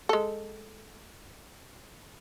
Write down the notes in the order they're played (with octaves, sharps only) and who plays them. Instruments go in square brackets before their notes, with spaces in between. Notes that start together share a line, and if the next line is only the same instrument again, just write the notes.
[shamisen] G#3 A4